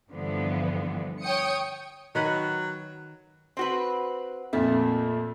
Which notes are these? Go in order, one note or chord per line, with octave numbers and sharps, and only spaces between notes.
G2 D3 E3 F3 B3
C#5 G5 D#6 C#7
D#3 F#3 B4 F#5
C4 F#4 B4
F2 A#2 A3